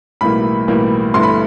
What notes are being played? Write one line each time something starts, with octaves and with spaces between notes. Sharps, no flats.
B1 A2 E3 G3 A#3 B5
B1 A2 E3 G3 A#3
G1 G2 E3 A3 C6
B5